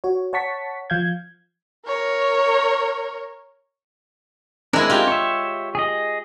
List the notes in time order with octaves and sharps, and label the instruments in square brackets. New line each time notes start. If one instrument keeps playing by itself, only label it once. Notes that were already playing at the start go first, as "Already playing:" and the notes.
[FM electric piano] F#4 C#5
C#5 F#5 A5 C#6 B6
F3 F5 G6 G#6
[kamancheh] A#4 C#5
[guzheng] G#3 E4 [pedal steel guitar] C4 D4 A#4
[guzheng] F4 G4
[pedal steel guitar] C#5 E5
G#4 D#5